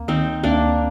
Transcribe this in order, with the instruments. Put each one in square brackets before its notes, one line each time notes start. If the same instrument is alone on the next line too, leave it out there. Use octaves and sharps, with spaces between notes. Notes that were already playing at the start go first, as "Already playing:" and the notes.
Already playing: [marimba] D2 [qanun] A#3
[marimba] D#3 [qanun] C4 D#4
[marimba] D2 [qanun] A#3 D4